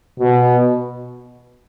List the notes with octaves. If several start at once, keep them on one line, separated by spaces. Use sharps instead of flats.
B2